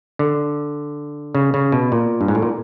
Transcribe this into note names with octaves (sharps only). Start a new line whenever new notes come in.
D3
C#3
C#3
B2
A#2
G2
G#2
A2
A#2